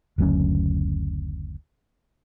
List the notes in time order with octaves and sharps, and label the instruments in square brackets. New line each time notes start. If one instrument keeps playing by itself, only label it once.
[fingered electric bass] F#1 D2 F#3 C#4